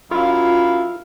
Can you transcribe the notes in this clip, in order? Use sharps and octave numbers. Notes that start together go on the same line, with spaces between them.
F#2 E4 F4 F5